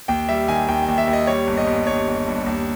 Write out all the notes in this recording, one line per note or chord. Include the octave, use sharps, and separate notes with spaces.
D#2 G5
G3 E5
D#3 G#5
D#2 G5
G5
D#2
E5
D#2
D#5
G3 C#5
G1
D#5
G1
G1 C#5
G1
G2
D#2